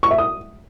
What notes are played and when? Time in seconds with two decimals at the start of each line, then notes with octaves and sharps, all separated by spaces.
0.03 C#6
0.11 E5
0.18 D#6